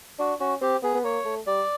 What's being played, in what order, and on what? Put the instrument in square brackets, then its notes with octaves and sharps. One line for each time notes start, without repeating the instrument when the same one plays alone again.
[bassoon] D4 [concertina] F#4
[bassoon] C#4 [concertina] F#4
[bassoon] C4 [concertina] G4
[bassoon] B3 [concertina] G#4
[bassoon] B3
[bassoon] A#3 [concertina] C#5
[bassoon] A3
[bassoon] G3 [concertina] D5